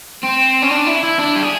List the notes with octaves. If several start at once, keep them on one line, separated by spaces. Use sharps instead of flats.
C4
C#4
D4
E4
E4
D4
G4
G#4